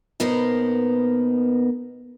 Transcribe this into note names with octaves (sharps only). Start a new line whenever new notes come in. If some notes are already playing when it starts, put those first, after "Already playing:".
B2 A#3 B3 D#4 A#4 C5